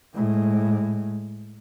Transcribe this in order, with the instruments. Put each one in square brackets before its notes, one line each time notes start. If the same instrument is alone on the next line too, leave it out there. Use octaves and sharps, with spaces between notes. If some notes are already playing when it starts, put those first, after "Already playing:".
[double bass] A2 G#3